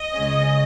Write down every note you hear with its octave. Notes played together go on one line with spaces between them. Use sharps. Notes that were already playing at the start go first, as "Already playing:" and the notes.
Already playing: D#5
C#2 C#3 G#3 C#4